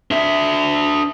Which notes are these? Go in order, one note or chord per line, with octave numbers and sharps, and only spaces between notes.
D4 E5